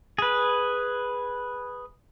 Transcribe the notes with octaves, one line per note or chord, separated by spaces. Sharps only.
G#4 B4